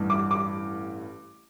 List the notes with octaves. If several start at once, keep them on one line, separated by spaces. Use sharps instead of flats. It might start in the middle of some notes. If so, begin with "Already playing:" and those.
Already playing: A1 G2 E3
D6
D6